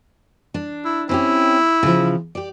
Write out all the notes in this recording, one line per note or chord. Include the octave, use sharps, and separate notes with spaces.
D4
E4
C4 C#4 E4 G4
C#3 F3
G4 D5